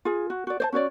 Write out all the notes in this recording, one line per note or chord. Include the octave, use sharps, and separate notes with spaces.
F4 G#4
F#4
F#4 D5
C5 D5 A5
C#4 F#4 C#5 D5